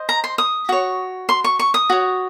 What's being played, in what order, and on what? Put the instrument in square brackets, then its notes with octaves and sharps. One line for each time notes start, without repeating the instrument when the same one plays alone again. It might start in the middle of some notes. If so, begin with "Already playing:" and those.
Already playing: [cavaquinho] C5 D#5
A#5
C6
D#6
F#4 C#5
C6
C#6
C#6
D#6
F#4 C#5